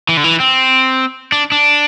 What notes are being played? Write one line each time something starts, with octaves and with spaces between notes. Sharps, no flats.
E3
D3
E3
C4
D4
D4